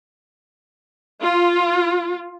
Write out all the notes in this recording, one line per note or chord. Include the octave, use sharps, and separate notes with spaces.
F4